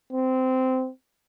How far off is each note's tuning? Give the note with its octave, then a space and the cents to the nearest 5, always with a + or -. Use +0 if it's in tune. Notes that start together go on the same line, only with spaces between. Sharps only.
C4 -15